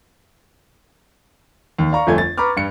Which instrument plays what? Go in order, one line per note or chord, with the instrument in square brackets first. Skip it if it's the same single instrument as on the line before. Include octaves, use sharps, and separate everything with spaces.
[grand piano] D#2
D5 F5 A#5 C#6
G1 F2 A3 G#5 G#6
A6
B4 A#5 B5 C#6 D6 F6
G2 C#7